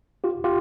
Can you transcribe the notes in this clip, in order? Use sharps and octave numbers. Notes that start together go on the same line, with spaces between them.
F4 G4
F4 G4